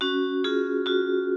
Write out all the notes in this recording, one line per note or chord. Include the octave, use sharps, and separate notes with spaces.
C#4 F#4
F4 G#4
F4 F#4